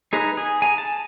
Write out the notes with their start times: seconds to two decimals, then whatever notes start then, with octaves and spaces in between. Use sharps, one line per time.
0.13 D#4 G#4 B4 A#5
0.37 G#4
0.62 G#5 A#5
0.78 A5